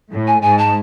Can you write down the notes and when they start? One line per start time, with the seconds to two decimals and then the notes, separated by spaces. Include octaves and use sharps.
0.11 A2
0.27 G#5
0.42 G#2 G#5
0.58 A5